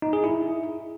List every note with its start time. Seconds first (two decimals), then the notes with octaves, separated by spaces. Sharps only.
0.02 D#4
0.13 G#4
0.24 E4